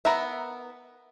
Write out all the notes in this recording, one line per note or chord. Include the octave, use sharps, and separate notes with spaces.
B3 A#4 B4 E5